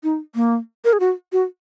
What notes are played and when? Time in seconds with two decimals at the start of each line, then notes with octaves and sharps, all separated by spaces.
0.04 D#4
0.35 A#3
0.85 A#4
0.93 G#4
1.00 F#4
1.32 F#4